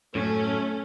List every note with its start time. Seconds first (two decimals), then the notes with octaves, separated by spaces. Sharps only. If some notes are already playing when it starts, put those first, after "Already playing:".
0.15 F#2 A2 A3 C#4